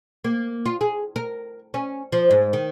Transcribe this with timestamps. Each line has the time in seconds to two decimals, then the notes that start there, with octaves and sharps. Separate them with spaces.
0.24 A#3
0.66 F4
0.81 G#4
1.16 A#4
1.74 C#4
2.12 F3
2.31 G#2
2.53 D#3